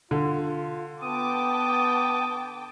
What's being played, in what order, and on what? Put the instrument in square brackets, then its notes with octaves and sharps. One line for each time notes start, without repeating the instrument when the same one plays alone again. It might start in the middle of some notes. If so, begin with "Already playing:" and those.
[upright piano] D3 [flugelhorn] F4
[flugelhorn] B3 [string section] G5 A5 D6 [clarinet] D#6